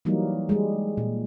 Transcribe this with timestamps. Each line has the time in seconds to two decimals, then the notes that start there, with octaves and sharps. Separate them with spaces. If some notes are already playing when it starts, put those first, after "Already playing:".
0.05 E3 F#3 G3 A#3 D#4
0.49 G3 G#3
0.97 A#2